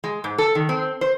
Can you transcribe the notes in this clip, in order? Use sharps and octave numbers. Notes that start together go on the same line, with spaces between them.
G#3
G#2
A4
D#3
C4
C5